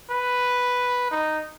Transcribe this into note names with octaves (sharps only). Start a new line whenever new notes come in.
B4
D#4